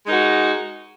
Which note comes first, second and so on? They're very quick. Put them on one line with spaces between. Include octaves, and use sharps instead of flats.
G#3 D#4 A#4 F#4